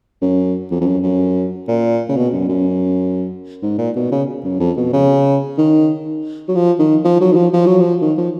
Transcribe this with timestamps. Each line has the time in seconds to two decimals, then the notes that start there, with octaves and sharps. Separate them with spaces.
0.22 F#2
0.71 F2
0.81 F2
0.86 F#2
1.03 F#2
1.68 A#2
2.09 C#3
2.16 B2
2.33 F#2
2.49 F#2
3.63 G#2
3.78 A#2
3.96 B2
4.12 C#3
4.44 F#2
4.60 F2
4.77 B2
4.93 C#3
5.58 D#3
6.48 F#3
6.55 F3
6.79 D#3
7.04 F3
7.20 F#3
7.32 D#3
7.36 F3
7.53 F3
7.66 F#3
7.80 F3
8.01 D#3
8.18 F3